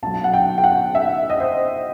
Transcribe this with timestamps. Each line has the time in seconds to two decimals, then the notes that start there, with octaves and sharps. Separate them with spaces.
0.03 B1 B2 F#3 A5
0.24 F#5
0.33 G5
0.58 G5
0.64 F#5
0.95 E5
1.30 D#5
1.40 C5